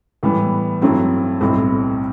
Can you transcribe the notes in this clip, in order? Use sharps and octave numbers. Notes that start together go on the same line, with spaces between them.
A2 E3 G3 B3
G2 F#3 A3 C4 E4
B1 A2 G3 C4 E4